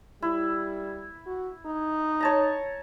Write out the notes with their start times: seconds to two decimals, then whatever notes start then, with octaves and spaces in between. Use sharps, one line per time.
0.22 G3 E4
1.27 F#4
1.66 D#4
2.20 C#5 A5 A#5